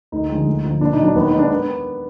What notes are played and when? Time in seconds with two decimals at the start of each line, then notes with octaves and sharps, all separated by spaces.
0.12 D2 D#4
0.29 D3 F3 G#3
0.46 D2
0.64 D3 F3
0.81 A#2 D4
0.93 D#4
0.98 F#3
1.04 D4
1.15 D#2 B3
1.27 D#4
1.33 D#3 G#3
1.39 D4
1.50 B3